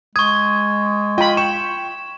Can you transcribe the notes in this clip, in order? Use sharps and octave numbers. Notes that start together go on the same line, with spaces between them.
G#3 C#6 D#6 G#6
F4 D#5 G5 B5
G5 C#6 E7